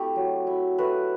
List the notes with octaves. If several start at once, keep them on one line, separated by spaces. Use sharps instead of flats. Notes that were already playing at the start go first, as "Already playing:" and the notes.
Already playing: A3 C4 E4 G4
F#3
E4
A3 B4